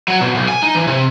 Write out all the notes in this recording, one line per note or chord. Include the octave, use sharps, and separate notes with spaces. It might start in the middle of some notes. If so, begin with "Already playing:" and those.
F#3
B2
B1
G#5
D#4
E3
C3